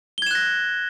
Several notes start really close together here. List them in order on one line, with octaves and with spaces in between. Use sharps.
G7 G#6 E7 F#6 A#6